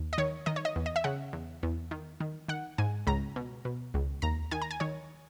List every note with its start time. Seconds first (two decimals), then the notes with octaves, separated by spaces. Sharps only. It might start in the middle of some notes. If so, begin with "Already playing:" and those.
Already playing: D#2
0.13 D#5
0.18 D#3 C#5
0.46 D#3 D#5
0.56 C#5
0.65 D#5
0.76 E2
0.86 D#5
0.96 E5
1.04 C#3 F#5
1.33 E2
1.63 E2
1.91 D#3
2.20 D#3
2.48 D#3 F#5
2.78 G#2 G#5
3.07 C#2 A#5
3.36 B2
3.65 B2
3.94 C#2
4.22 D#2 A#5
4.51 D#3 G#5
4.62 A#5
4.71 G#5
4.80 D#3 C#5